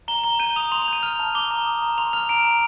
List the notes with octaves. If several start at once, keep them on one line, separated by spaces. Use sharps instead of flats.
A#5 G7
A#5 G7
G6 D#7
D#6 F7
C6 F7
F7
G6 D#7
F6 F7
A5
D6 G7
A#5
D#6
A#5
C6 F7
F6 F7
A#5 D7
A#5